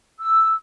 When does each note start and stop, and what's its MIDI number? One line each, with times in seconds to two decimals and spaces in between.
0.19 0.52 88